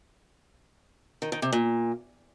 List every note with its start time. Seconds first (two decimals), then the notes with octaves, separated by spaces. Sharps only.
1.22 D#3
1.32 D#3
1.42 C3
1.53 A#2